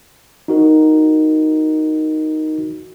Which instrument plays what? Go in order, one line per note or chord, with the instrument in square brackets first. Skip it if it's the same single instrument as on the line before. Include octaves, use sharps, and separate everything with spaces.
[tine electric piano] D#4 F#4 A#4